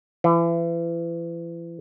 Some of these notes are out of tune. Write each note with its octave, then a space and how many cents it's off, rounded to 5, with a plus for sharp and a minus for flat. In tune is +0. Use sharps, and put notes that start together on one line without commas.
E3 +35